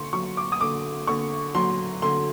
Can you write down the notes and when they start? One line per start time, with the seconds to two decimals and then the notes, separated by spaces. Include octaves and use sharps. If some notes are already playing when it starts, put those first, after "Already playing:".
Already playing: D3 C6 C#6
0.13 F#3 C#6
0.37 D6
0.52 D#6
0.61 D3 D6
1.07 D3 C#6
1.55 F#3 C6
2.02 D3 C6